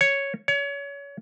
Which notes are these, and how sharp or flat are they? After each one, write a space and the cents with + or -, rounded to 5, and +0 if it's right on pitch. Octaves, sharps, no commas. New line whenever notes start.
C#5 +0
C#5 +30